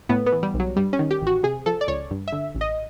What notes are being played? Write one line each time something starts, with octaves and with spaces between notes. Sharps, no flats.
A2 B3
B3
E3
G3
B1
F#3
G2 G3
C#4
D#3
G4
A1 F#4
C3 G#4
F3 A4
D5
C#2 C#5
G2
D3 E5
A1
D#5